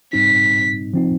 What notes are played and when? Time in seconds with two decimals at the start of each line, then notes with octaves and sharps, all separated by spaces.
0.13 G#2 G3 C4 D#4 B6
0.94 F3 C4 D#4